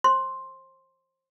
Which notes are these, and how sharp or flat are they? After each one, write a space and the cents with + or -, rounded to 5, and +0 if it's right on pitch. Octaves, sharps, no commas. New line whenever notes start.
C5 +25 C6 +5